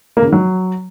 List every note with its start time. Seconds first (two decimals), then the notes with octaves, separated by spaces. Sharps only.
0.17 A#3
0.22 C#3
0.27 D#3
0.33 F#3